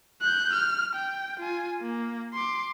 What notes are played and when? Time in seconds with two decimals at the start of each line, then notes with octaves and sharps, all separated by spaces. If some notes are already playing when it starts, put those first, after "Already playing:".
0.22 F#6 G6
0.53 F6
0.95 G5
1.40 F4 G#5
1.82 A#3
2.33 C6 D6